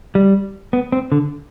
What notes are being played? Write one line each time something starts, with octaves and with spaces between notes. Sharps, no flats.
G3
B3
C4
D3